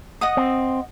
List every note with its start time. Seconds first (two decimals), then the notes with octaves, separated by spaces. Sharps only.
0.21 D#5 F#5 D#6
0.37 C4